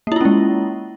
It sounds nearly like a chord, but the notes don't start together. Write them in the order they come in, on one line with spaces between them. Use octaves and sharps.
A#3 E4 F4 C#4 G#3